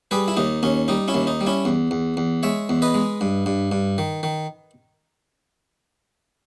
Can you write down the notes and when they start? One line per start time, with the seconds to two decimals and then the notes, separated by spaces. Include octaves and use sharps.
0.11 G3 G#4 B4
0.28 E4
0.37 D#2 D#4
0.63 D#2 C#4
0.88 G3 D#4
1.08 C#4 E4
1.14 D#2
1.27 D#4
1.41 G3
1.47 C#4 E4
1.65 E2
1.91 E2
2.17 E2
2.43 G#3 C#5 E5
2.69 E2
2.82 B4 D#5
2.94 G#3
3.21 G2
3.46 G2
3.72 G2
3.98 D#3
4.23 D#3